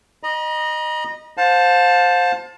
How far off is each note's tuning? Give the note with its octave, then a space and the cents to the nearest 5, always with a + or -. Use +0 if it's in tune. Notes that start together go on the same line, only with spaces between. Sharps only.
D#5 -15 A#5 +45
C5 +0 F5 +35 A5 +0